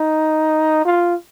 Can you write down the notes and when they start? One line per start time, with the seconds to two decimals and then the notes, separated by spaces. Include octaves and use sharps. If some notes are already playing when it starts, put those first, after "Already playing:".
Already playing: D#4
0.85 F4